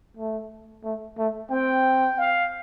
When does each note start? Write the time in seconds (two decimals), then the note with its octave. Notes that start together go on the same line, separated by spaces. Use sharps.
0.17 A3
0.84 A3
1.18 A3
1.51 C4 G5
2.18 F5